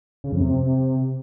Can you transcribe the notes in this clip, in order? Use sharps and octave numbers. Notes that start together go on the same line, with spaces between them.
C#3
F2
C3